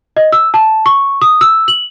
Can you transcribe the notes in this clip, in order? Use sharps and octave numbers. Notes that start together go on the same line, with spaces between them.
D#5
E6
A5
C#6
D#6
E6
F#7